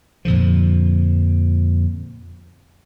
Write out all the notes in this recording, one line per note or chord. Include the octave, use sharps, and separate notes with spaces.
F2 A#2 D3 F3